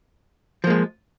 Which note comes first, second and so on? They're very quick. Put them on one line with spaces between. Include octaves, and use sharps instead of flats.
F3 A#3 G#3